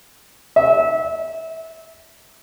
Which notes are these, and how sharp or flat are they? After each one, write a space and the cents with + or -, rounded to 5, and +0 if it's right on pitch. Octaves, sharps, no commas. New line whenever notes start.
E5 -25